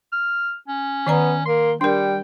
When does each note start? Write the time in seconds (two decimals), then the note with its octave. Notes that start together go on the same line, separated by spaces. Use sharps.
0.13 F6
0.68 C#4
1.07 D#3 B3 D5 A#5
1.46 A#3 C6
1.81 G3 D4 A#4 G5